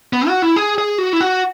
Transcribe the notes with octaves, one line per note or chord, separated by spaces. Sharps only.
B3
F#4
E4
G#4
G#4
F#4
E4
F#4